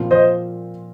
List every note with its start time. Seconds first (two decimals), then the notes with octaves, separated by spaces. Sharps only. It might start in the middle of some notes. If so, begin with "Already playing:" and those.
Already playing: A#2 F3 C4
0.11 C5 D#5